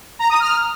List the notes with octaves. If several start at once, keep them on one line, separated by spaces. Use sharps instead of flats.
A#5
D#6
F6